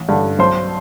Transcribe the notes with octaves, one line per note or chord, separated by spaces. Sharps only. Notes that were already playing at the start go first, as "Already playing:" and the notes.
Already playing: A1
G2 D3
B1 C5 C6